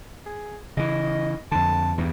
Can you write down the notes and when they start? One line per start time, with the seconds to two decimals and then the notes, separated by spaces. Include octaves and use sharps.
0.26 G#4
0.77 C#3 E3 D#5
1.52 F2 D3 A5
1.98 E2 G2